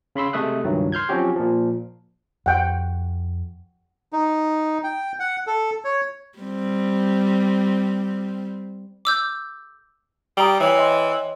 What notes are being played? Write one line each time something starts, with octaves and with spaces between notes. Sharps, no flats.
C#3 B5 C6 E6
C3 G#3 A3 E5 D#6 F#6
C#2 G2 D#3 F#3
C6 F6 G6 G#6
F3 F#3 C4 C#4 F#4 G4
A#2 F3
F2 F#5 G5
D#4
G5
F#5
A4
C#5
G3 C4
D6 E6 G6
G3 G5 A#5 D#6
E3 C#5 F7
D#5 C6